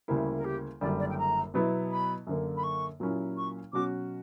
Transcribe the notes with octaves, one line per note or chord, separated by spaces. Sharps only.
D2 C#3 G3 A#3 E4
A#4
G4
F#1 F#2 D3 G3 D5
D5
G5
A#5
B2 F#3 B3 E4
B5
F#2 D3 A#3
B5
C#6
A#2 F#3 A#3 C#4 E4
C#6
B2 F#3 C#4 F#4 D6